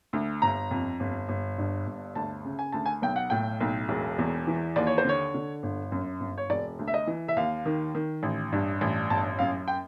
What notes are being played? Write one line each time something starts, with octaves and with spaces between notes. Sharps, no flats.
D2
G1 A#5
F2
G1
G1
G2
G1
D2 A5
C#3
G#5
D2 A5
G#5
B1 G5
F#5
A2 G5
B1
E1
E2
E3
D#2 D5
C#5
C5
D3 C#5
D3
G1
F#2
G1
C#5
E1 D5
D2
E5
D#5
E3
E5
D#2 F5
D#3
D#3
A1
G2
A1
G1 A5
F#2 F5
G5